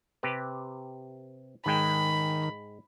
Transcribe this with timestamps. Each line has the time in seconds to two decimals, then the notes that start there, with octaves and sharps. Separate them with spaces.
0.23 C3 G4 B4
1.66 G#2 D#3 G#3 G5 B5